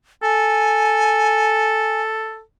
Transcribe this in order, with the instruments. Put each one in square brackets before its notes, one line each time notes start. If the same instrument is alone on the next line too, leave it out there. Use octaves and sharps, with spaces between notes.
[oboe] A4 [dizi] G#5